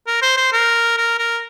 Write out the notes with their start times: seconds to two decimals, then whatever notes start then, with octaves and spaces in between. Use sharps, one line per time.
0.07 A#4
0.22 C5
0.37 C5
0.53 A#4
0.97 A#4
1.19 A#4